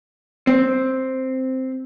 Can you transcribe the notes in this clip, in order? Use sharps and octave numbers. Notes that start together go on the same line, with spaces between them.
C4